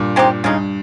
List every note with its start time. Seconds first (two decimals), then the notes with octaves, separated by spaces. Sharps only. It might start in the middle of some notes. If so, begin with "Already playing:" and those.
Already playing: G2 A#2
0.16 G#3 C4 D#4 G4
0.44 G2 C#3 G#3 D#4